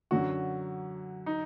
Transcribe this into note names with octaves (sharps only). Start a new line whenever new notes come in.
F#2 D3 F#3 F#4
D#4